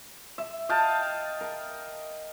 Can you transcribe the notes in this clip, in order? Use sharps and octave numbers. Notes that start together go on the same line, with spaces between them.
E5
D#5 F5 G5 A5
A#4